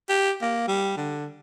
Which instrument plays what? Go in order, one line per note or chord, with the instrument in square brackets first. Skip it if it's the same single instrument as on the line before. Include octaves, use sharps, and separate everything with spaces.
[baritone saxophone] G4
A#3
G3
D3